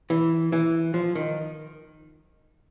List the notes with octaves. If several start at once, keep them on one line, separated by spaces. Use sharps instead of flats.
E3
E3
F3
D#3